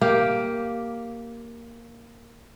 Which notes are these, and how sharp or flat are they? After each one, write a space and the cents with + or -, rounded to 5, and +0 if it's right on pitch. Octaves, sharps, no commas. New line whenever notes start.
A#3 +0 G4 +0